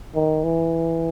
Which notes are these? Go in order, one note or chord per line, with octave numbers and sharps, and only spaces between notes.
D#3
E3